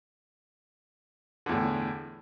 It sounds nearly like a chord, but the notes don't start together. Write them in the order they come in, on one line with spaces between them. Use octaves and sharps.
D3 E2 A2